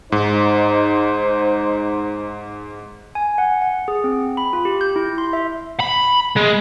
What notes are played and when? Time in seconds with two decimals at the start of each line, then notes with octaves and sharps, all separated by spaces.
0.12 G#2 D#4 C5
3.15 G#5
3.38 F#5
3.62 F#5
3.88 G#4
4.04 C4
4.37 B5
4.53 F4
4.65 G4
4.81 G6
4.96 E4
5.18 C6
5.33 E5
5.80 B5
6.37 G#3